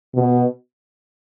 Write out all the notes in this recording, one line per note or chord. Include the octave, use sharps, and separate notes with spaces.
B2